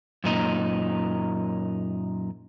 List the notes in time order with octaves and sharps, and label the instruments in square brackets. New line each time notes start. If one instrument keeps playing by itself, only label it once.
[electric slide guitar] F#2 A#2 D#4